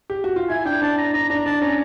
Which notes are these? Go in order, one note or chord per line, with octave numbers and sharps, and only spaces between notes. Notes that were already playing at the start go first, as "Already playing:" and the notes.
G4
F#4
F4
E4 G#5
D4 G5
D4 A5
A#5
D4 A#5
D4 A#5
D4 A5
C#4 A#5